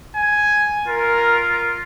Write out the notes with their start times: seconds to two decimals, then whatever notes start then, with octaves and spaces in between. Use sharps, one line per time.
0.16 G#5
0.87 F4 A#4